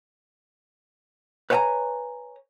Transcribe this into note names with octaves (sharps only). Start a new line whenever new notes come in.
B4 C#5 E5 G5 G#5 A#5